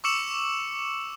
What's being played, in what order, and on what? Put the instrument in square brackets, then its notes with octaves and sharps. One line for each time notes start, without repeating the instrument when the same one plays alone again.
[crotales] C#6 D6 E6 C#7 E7 F#7